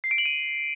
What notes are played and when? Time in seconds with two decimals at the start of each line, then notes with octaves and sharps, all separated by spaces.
0.04 C7
0.11 D7
0.18 F#7
0.26 D#7